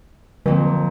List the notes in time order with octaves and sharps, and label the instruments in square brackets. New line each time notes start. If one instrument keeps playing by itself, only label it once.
[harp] F2 A#2 C4 [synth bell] D3